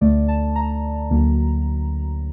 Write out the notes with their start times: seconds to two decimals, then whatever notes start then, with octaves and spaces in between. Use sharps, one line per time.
0.01 D2 D3 A3 D5
0.28 A5
0.56 A#5
1.10 D2 D3 F#3 A#3